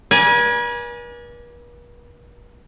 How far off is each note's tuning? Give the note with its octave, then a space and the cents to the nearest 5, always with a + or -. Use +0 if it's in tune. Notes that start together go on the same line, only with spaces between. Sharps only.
B4 -45 D5 +0 G#5 +0